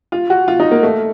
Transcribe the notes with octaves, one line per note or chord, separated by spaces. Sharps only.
F4
F#4
F4
D#4
A#3
A3